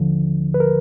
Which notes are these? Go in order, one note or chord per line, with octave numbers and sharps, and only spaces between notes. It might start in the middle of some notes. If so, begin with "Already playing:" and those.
Already playing: D#2 D3 F3
B4
A#4